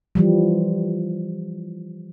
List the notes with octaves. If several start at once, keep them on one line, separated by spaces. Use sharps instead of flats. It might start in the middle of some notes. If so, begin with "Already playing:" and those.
E3 F3 G3